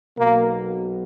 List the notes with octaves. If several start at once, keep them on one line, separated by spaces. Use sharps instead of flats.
B1 B2 A#3